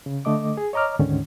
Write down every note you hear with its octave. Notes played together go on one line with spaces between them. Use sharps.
C#3
D3 A3 D#5 D6
G#4
C#5 D#5 A#5 D6 F6
D2 G#2 D3 D#3 C#4